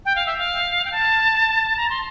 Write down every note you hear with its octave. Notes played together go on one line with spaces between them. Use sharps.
G5
F5
E5
F5
G5
A5
A#5
C6